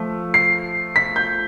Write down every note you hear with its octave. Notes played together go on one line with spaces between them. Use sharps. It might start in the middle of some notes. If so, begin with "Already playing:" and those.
Already playing: F3 A3
C7
B6
G6